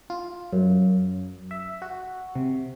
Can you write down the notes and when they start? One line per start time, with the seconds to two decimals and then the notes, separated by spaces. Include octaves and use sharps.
0.10 F4
0.53 F#2
1.51 E5
1.82 F#4
2.35 C3